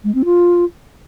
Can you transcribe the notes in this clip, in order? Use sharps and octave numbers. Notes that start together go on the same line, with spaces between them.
G#3
C4
F4